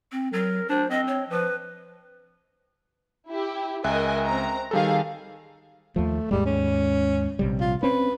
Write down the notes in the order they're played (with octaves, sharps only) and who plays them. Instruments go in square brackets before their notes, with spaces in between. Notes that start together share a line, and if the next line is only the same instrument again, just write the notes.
[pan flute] C4
[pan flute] F#3 [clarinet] A#4
[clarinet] D4 [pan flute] C5
[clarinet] C4 [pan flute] D#5
[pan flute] C#5
[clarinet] F3 [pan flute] B4
[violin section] E4 G4
[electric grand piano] C#2 E5 F#6 [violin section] A#4 D#5 G#5
[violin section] C4 A#5
[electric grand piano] D#3 G3 A4 [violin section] G#4 F5
[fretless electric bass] D#2 F3 [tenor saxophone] A3
[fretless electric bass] D#2 G#2 G#3 [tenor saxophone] G3
[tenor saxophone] C#4
[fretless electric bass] A#1 C3 G3
[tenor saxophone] F4
[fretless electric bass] C4 C#4 [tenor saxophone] B4